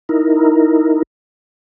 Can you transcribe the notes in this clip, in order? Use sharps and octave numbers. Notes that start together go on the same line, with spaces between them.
D#4 E4 A#4